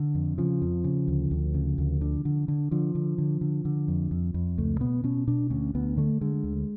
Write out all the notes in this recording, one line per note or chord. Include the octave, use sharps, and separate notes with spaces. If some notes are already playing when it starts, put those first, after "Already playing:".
Already playing: D3
F2
C#3 F3
F2
C#3
D2
D2
C#3
D2
D3
D3
D3
D3 F3
D3
D3
D3
D3
F2
F2
F2
C#2 A3
B2 B3
B2 C#4
B2 D4
D2 C#4
D2 B3
D3 A3
D3 G#3
D2